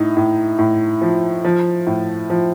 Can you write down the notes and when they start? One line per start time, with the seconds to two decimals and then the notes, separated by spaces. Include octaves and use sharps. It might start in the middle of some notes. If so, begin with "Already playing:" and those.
Already playing: A2 D#4
0.17 A2
0.58 A2
1.01 F3
1.44 F3
1.87 A2
2.30 F3